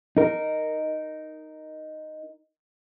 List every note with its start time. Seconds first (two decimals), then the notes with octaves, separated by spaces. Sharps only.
0.17 D#4 A#4